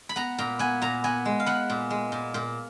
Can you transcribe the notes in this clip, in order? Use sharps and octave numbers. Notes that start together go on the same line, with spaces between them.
B5
B3 A#5
A#2 A#5
B3 G#5
A#2 A#5
B3 G#5
G#3
F5
B3 F#5
A#2
G#3
A#2
A#2